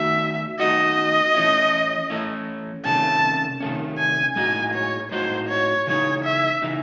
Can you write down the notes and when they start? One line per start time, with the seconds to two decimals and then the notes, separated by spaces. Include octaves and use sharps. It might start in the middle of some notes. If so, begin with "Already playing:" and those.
Already playing: D#3 A3 D#4 F#4 E5
0.59 D#3 A3 D#4 F#4 D#5
1.34 E3 A3 C#4 E4
2.10 E3 A3 C#4 E4
2.85 C3 D#3 A3 C#4 A5
3.60 C3 D#3 A3 C#4
3.98 G#5
4.36 A2 G#3 D#4 F#4 G#5
4.74 C#5
5.12 A2 G#3 D#4 F#4 C5
5.49 C#5
5.87 C#3 E3 G#3 D#4 C#5
6.24 E5
6.62 C#3 E3 G#3 D#4